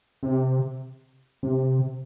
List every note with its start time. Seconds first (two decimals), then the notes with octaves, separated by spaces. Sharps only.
0.23 C3
1.43 C3